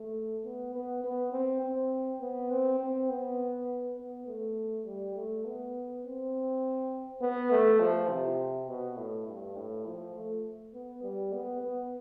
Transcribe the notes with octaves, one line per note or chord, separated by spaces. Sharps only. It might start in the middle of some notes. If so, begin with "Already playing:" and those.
Already playing: A3
B3
B3
B3
C4
C4
B3
C4
C4
B3
B3
A3
G3
A3
B3
C4
B3
A3
F3
C3
B2
A2
G2
A2
F3
A3
B3
G3
B3
B3